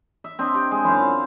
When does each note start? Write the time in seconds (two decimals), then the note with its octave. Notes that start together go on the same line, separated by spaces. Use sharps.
0.24 E5
0.39 C4 D4 D#5
0.54 G4
0.71 G#3
0.84 F#2 E4 C5 F5
0.99 F4